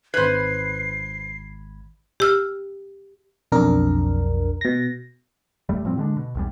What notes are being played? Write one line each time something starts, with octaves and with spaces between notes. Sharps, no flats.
G#1 B4 C5 B5 G#6 C7
G4 E6 F6
B1 F2 D4 A#4
B2 A#6
F1 F#2 G3 A3
A2 F3 G3 C4
D3 G#3 D4
B2
B1 E2 G3